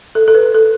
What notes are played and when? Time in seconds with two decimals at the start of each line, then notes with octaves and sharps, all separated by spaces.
0.15 A4
0.28 A4
0.34 B4
0.55 A4